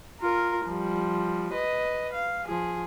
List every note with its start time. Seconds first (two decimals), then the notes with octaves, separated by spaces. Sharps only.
0.22 F4 A#4
0.65 F3 G3
1.52 B4 D#5
2.13 F5
2.44 F3 G#4